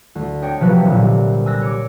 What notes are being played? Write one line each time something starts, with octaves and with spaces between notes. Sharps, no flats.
D2
D4 C#5 D#5 G5
C3 F3 F#3 B4 E5
C2 A#2 D3 G3
G#5 E6 F#6 A#6
C#5 D6